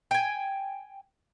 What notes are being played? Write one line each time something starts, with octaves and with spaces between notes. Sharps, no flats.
G5 G#5